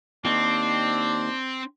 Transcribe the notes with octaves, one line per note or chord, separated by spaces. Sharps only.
D#2 C4 D4